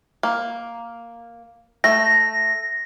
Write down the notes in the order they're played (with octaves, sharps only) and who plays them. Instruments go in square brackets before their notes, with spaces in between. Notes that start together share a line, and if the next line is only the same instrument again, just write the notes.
[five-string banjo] A#3
[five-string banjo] A3 [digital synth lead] A#6